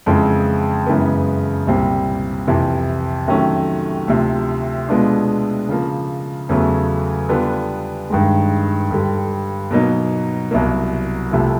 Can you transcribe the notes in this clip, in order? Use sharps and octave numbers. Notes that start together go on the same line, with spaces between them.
F2 C#3 E3 G#3 C4
F#2 C#3 E3 G#3 B3
C2 A#2 G3 C4
F2 C3 E3
C3 D#3 F#3 A3 C#4
D2 C3 F3
B2 G#3 B3 D4 F4
C#3 F3 A#3
E2 C#3 F#3 A3
D3 G3 B3 D4 F4
G2 D#3 G#3
G2 D3 G3
B2 F#3 A#3 D#4
C2 B2 F#3 A#3
C2 C3 F3 A3